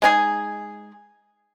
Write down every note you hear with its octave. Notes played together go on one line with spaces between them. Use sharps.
G#3 D#4 G#4